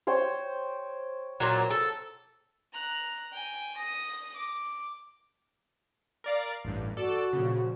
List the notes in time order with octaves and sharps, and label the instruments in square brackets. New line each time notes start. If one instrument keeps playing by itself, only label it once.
[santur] C5 C#5 G5
[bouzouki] A#2 F#3
A4
[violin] A#5 F#6
G5 G#5
D#6 A#6
D6
[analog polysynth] A#4 D5 F5
A1 G2
[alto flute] F#4 [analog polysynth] A4 D5 E7
[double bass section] A#2 F3 [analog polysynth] C#3